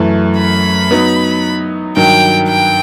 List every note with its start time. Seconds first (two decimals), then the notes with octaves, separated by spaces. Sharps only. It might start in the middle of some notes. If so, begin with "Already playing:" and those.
Already playing: F#2 E3 A3
0.38 B5
0.91 F#3 B3 D#4
1.96 G2 D#3 F#3 G5
2.48 G5